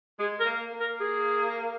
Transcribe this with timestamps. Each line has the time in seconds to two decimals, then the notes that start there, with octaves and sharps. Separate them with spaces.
0.19 G#3 G#4
0.40 A#4
0.46 A#3
0.74 A#3
0.80 A#4
1.00 G#4